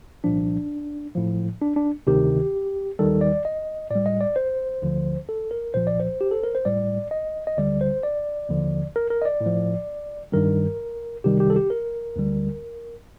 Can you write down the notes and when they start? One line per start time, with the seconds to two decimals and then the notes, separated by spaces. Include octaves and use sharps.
0.24 C2 A#2 F3 D4
1.15 A2 F3
1.61 D4
1.76 D4
2.07 D2 C3 D#3 G4
2.99 D#2 D#3 G3 A4
3.21 D5
3.45 D#5
3.90 A2 G3 D5
4.06 D#5
4.21 D5
4.36 C5
4.82 D2 D3 F3
5.29 A4
5.51 A#4
5.74 C2 A#2 F3 C5
5.87 D5
6.00 C5
6.21 G4
6.31 A4
6.44 A#4
6.55 C5
6.65 A2 G3 D5
7.11 D#5
7.47 D#5
7.57 D2 D3 G3 D5
7.81 C5
8.03 D5
8.49 D#2 D3 F3
8.96 A#4
9.10 A#4
9.22 D#5
9.25 D5
9.41 A2
9.46 F3
10.32 G2 D#3 G3 A#4
11.24 C2 C3 D#3 G3 G4
11.40 G4
11.50 A4
11.56 G4
11.70 A#4
12.16 D2 D3 G3